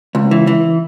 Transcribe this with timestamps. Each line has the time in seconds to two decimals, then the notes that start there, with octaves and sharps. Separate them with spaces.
0.15 C#2
0.31 E3
0.47 E3